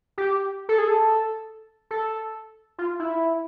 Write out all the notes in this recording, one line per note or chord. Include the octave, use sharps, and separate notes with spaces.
G4
A4
G#4
A4
A4
F4
E4